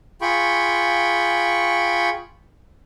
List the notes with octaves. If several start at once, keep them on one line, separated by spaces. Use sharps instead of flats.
F4 G#4 G5 B5 C#6